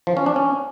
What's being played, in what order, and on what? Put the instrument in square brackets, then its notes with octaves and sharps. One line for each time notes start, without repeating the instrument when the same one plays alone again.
[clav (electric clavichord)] F3
C#4
D4
C#4